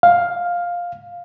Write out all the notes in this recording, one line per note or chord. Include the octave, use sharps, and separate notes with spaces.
F5